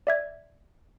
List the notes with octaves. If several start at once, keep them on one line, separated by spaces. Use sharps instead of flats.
D5 E5 G#6